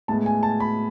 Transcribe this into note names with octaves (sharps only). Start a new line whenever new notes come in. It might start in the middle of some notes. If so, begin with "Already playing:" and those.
A2 G#3 B3 A5
G#5
A5
B5